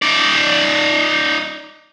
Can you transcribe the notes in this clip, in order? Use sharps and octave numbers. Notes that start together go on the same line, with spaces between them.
D#4 D5